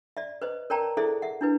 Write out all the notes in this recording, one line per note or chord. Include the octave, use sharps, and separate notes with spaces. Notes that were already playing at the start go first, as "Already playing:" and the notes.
D5 E5
B4 C5 D#5
A#4 C#5 D5 G5 A5 A#5
E4 G#4 A4 C5 D5 E5
E5 F#5
D4 E4 B4